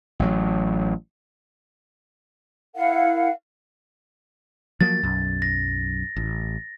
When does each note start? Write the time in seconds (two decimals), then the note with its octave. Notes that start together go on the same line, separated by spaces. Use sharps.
0.19 A1 F#3
2.75 E4 A#4 F5 F#5
4.81 F3 F#3 A#3 A6
5.03 B1 F#2
5.42 A#6
6.17 A1